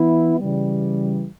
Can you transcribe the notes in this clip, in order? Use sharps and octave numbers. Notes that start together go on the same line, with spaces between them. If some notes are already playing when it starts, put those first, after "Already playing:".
Already playing: E3 B3 E4
C#3 E3 G3